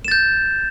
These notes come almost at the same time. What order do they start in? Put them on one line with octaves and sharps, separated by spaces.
E7 A6 G6